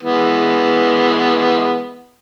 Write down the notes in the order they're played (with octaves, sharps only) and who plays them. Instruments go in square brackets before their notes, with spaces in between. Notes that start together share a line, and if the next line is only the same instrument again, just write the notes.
[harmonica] E3 G#3 B3